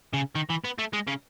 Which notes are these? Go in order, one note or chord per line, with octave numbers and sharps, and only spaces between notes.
C#3
D#3
E3
B3
A3
G#3
C#3